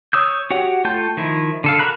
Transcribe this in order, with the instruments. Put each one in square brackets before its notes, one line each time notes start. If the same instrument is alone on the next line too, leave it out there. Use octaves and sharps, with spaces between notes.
[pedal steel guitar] C#5 D#6 E6 G6
F#4 G4 C#5 F#5
A3 F4 G5 A5 G6
D#3 F3 E4
D3 A4 F5
F#4 A#4 A#5 B5 F#6